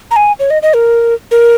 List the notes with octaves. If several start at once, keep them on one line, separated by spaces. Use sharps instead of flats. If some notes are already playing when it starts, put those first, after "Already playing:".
A#5
G#5
C#5
D#5
D#5
A#4
A#4